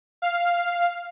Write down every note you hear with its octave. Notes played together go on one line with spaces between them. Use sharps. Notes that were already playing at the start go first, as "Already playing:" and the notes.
F5